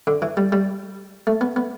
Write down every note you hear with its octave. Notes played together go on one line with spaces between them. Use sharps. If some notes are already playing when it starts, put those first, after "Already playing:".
D3
E3
G3
G3
A3
B3
B3